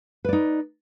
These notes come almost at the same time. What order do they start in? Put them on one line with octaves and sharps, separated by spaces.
B4 D5 D#4